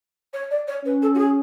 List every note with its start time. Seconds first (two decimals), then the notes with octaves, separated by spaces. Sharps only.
0.33 C#5
0.51 D5
0.68 C#5
0.85 C#4 B4
1.02 A4
1.15 F#4
1.19 G#4